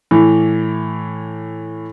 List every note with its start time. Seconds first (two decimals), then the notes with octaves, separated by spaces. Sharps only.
0.11 A2 E3